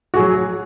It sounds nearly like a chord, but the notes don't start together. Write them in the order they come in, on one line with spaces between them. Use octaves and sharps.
F#4 G#4 F#3